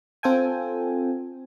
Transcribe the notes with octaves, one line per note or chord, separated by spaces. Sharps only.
C4 F4 A4 G5 G#5